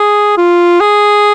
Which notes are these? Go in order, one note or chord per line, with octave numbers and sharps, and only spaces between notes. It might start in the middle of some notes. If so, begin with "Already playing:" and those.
Already playing: G#4
F4
G#4